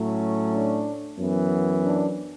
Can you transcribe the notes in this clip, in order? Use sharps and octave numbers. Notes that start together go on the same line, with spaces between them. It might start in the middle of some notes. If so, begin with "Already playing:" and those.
Already playing: A2 F#3 A3 C#4
D4
F#2 E3 B3
D4